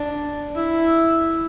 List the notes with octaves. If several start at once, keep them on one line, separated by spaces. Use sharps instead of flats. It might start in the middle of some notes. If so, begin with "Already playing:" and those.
Already playing: D4
E4